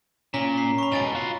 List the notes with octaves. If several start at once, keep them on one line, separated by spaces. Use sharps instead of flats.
A#2 C#4 A#5 B6
B6 C7
B5 C#6
G#2 B2 G#5 A6 D7
F4 F#4 F5